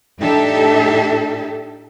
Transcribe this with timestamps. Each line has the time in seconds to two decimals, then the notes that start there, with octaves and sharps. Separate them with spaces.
0.20 A2 D4 D#4 G4 A4 E5